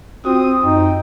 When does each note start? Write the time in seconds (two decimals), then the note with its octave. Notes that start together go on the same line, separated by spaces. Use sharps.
0.25 C4 F4 F#4 D#6
0.63 F#2 D#4 G5